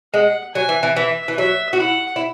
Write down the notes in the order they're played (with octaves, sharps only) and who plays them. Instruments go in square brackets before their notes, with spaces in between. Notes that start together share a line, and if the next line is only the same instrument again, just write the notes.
[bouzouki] G#3 [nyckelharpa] F#5
[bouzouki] F#3 [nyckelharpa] G#5
[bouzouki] E3
E3
[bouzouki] E3 [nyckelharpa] E5
[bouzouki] E3
[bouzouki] F#3 [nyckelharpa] E5
[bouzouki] F#4
[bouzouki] E4 [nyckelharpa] F#5
[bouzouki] E4